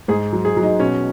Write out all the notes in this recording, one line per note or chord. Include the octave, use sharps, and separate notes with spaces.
G#2 G#4
F#3
G#4
F#3
D#4
B2 C#4